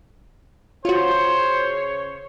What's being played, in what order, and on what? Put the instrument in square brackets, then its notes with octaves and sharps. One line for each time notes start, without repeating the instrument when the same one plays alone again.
[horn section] C#3 C#5 [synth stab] F4 F#4 [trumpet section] C5